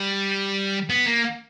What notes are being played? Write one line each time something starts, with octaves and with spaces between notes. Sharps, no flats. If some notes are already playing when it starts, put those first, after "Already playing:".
Already playing: G3
B3
A#3